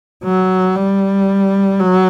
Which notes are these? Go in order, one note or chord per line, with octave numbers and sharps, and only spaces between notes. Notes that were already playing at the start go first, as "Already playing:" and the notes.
F#3
G3
F#3